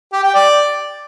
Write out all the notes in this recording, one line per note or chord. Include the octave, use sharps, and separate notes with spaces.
G4
G5
D5